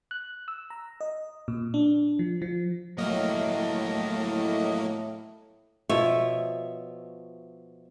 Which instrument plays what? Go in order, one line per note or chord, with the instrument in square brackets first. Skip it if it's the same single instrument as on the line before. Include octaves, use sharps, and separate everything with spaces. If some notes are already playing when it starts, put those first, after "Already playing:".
[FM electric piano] F#6
E6
A#5
D#5
A#2
D4
F3
F3
[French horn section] A2 [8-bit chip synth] F#3 A#3 [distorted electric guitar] D#5 F5
[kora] B2 F3 C#5 [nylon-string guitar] E5